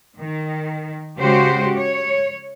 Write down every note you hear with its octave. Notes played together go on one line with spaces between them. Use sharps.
D#3
C#3 G#3 F#4 G4 C5
C#5